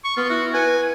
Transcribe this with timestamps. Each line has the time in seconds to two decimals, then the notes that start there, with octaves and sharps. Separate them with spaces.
0.05 C#6
0.17 B3 F4
0.30 E4 F#4
0.54 B4 G#5